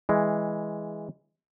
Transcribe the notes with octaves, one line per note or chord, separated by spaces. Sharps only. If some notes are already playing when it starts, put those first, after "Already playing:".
E3 G#3